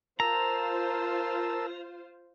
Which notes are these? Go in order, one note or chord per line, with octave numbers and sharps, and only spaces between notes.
F4 A#4 C5 A5 A#5 E6